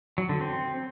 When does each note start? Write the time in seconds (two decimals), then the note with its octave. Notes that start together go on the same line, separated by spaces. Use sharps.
0.18 F#3
0.29 D3
0.41 C4